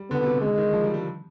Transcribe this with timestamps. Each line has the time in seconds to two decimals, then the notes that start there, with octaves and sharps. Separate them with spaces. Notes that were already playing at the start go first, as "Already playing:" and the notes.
Already playing: G3
0.10 D3 B3
0.21 B2
0.26 C3
0.41 D3 G#3
0.58 D#3
0.73 F3
0.84 G3
0.94 G3